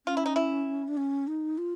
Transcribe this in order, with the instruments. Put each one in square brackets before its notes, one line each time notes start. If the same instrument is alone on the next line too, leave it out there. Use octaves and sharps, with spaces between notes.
[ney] C#4 [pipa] F4
[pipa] E4
D#4
E4
[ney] D4
C#4
D#4
F4